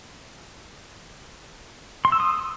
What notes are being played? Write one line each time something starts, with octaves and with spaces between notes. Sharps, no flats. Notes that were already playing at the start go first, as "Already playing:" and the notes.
C6
E6
D#6